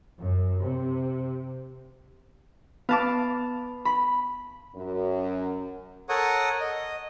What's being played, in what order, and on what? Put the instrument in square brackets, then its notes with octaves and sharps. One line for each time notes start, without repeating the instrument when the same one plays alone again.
[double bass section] F#2
C3
[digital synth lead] B3 [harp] F5 A5 D6
[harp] B5
[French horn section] F#2
[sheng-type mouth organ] A4 A#4 C#5 F#5 C#6 D#6
D#5